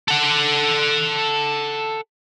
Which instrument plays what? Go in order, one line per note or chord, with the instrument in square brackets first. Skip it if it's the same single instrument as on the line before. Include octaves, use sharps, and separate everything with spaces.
[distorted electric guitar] A4 F#5